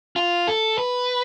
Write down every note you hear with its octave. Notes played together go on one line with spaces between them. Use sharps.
F4
A4
B4